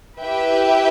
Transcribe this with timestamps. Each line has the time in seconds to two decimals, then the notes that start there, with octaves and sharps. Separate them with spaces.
0.22 E4 G4 B4 E5 G5